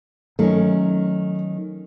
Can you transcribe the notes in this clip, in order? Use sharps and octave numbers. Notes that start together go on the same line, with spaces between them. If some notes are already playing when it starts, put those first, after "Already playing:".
D#3 F#3 A3 C#4